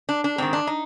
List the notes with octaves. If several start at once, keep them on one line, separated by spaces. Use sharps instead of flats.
D4
D4
G#2 D#3 C4
D4
D#4